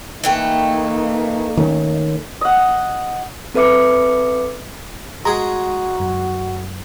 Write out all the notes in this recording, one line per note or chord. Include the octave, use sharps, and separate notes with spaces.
E3 A3 A#3 D#4 G5
D#3 A3 C#4
D#5 F#5
C4 A4 B4 E5 D6 C#7
G#3 F#4 G#4 A#5
F#2